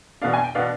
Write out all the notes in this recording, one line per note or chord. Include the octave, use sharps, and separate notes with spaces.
B2 B3 D4 F5
G#5
G5
B2 B3 D4 F5